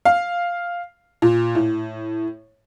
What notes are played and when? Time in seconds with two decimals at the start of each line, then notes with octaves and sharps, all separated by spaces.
0.05 F5
1.22 A#2
1.55 A2